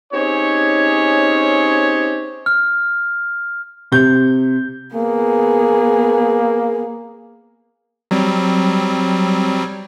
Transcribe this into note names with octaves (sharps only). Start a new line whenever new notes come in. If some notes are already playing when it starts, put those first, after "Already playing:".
C4 C#4 D#4 G4 G#4 C#5
F6
C3 G6
A#3 B3 G#4
F#3 G3 C4